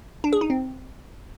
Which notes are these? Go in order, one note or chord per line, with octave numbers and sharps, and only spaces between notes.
D4
G#4
D#4
C4